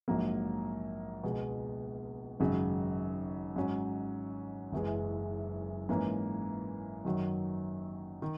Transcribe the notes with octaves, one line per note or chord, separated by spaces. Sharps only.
A#1 G#2 F#3 A#3
C#2 B2 G#3
G#1 F#2 C#3 F#3
G#2 F#3 C#4
F#1 F#2 E3 G#3
G#2 E3 A#3 C#4
F#2 D#3 F#3
D#3